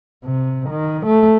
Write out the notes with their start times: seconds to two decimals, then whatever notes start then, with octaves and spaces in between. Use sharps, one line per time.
0.25 C3
0.70 D#3
1.06 A3